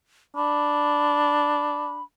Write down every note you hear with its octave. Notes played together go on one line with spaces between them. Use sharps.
D4 B5